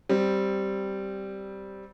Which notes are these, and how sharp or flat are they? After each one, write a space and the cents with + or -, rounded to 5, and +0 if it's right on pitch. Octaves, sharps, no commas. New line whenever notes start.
G3 -5 C4 +0